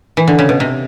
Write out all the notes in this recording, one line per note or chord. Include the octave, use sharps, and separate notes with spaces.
E3
D3
C#3
B2
C3